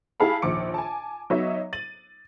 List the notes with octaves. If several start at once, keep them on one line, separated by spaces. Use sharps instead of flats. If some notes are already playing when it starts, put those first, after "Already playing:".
E4 G4 G#4 F5 A5 B5
A#1 D#2 D6 C#7
G#5 A5
F#3 B3 D#4 C#5 D#5 E5
A6 D#7 F#7